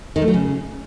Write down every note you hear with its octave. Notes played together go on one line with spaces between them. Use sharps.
D#3
A3
F#3
C#3